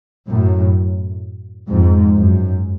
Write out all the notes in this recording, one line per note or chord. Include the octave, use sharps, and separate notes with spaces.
F#2 A2
F2 G#2
F#2